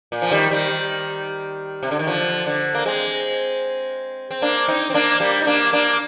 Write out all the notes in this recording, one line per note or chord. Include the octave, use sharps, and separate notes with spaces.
A#2
F3
D#3 G3
D#3 G3
C3
D3
D#3
D3 F3
D3
A#3
G#3 C4
C4
A#3 D4
C4 D#4
C4
A#3 D4
G3 A#3
D#4
A#3 D4
A#3 D4